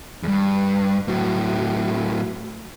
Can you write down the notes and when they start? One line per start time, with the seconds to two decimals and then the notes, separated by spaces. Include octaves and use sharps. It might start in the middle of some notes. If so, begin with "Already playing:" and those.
0.23 E2 G2
1.08 A2 F#3